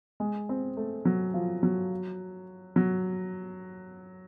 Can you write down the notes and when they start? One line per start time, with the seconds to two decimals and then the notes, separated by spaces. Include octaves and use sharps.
0.20 G#3
0.49 C4
0.77 A3
1.05 F#3
1.34 F3
1.63 F#3
2.76 F#3